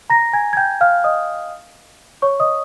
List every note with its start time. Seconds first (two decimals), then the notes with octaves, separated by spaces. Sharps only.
0.10 A#5 A#6
0.33 G#5 G#6
0.53 G#6
0.57 G5 G6
0.81 F5 F6
1.04 D#5 D#6
2.22 C#5 C#6
2.40 D#5 D#6